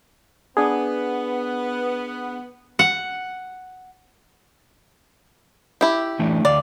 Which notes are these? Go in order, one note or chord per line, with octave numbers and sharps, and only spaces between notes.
B3 D4 G#4
F#5
E4 G4
E3 A3 D4
D2 D5 F5